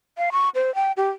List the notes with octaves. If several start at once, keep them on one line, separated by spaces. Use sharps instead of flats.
F5
C#6
C5
G5
G4